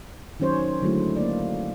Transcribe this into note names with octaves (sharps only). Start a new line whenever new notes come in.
D#3 F#3 C#4 C5 C#5
D3 F#3 G#3 A3 E4
A#3 D5